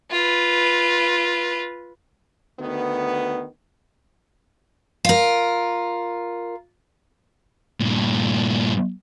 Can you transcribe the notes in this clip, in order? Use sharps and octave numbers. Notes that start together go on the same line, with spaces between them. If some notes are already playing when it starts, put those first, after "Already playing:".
F4 B4
D2 D#3 B3
F4 A#4
G2 A#2